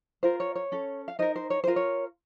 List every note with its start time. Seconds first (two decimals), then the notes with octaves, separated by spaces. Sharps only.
0.23 F4 A#4 C5
0.40 C#5
0.55 C#5
0.72 C#4 A4
1.08 F5
1.19 D#4 A#4 C5 D#5
1.36 C5
1.50 C#5
1.64 F4 A#4 C5
1.76 C#5